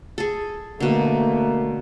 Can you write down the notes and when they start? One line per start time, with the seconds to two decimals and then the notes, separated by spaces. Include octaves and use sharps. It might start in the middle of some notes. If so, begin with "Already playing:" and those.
0.18 G#4 A4
0.80 B2 D3 A3 A#3